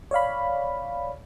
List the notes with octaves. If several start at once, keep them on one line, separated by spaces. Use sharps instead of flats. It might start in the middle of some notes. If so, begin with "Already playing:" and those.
C#5 D5 F5 B5